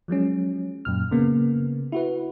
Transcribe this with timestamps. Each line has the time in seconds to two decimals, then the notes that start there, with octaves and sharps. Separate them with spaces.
0.08 F3 F#3 G#3 C#4
0.85 F#2 A#2 F6
1.11 C#3 A#3 B3
1.92 E4 F#4 B4